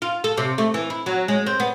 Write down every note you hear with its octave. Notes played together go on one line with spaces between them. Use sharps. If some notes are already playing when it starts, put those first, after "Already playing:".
F4
A4
C3
A3
E3
E4
F#3
G#3
C4
B3